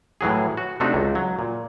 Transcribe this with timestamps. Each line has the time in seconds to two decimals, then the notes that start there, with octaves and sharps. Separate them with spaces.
0.21 A2 E3 F#3 G#4
0.57 F#4
0.80 C3 A3 C4 D4 D#4 F#4
0.94 C#2
1.15 F#3
1.39 A#2